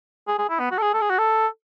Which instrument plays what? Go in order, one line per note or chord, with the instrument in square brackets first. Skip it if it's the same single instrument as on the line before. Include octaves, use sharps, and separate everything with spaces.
[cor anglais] G#4
G#4
E4
B3
F#4
A4
G#4
A4
G#4
F#4
A4